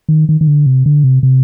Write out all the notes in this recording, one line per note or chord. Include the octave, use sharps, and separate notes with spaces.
D#3
D#3
D#3
D3
C3
D3
C3
C3